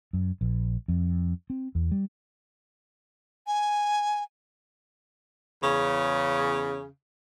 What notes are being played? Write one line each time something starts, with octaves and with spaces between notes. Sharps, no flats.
F#2
A#1
F2
C4
E2
G3
G#5
E2 C#3